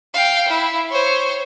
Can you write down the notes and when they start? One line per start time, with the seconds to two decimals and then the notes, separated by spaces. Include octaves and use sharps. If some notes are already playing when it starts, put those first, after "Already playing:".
0.14 F5 G5
0.49 E4
0.91 C5 C#5